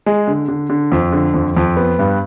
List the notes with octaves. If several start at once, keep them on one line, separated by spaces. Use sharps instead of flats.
G#3
D3
D3
D3
F2
D3
F2
F2
B3
G2